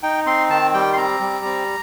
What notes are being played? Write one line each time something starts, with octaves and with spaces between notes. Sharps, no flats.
D#4 G5
C4 C6
D#3 A5
G3 G5
C6
C4 A#5
G3
C4